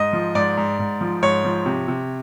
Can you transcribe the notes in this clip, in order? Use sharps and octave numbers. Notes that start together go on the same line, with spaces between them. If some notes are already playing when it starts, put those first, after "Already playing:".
Already playing: G#2 D#5
F3
G#2 D5
G#2
G#2
F3
G#2 C#5
F3
C3
C3